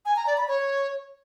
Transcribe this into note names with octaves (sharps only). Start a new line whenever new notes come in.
G#5
A#5
D5
B5
C#5